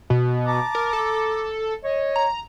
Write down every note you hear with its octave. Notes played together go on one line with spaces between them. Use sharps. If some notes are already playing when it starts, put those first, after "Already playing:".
B2
A5 A#5 D6
A#4
A4
C#5 D#5
A#5